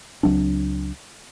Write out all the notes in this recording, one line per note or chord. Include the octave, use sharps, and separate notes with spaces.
C#2 F#3 C4 D4